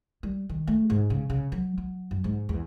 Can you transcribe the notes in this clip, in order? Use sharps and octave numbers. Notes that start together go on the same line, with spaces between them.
G3
D#3
A3
G#2
C#3
C#3
F#3
F#3
F#2
G#2
E2